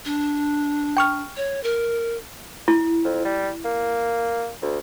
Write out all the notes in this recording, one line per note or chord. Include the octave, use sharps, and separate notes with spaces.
D4
G5 C#6 F6
C#5
A#4
E4
F2
G3
A#3
D2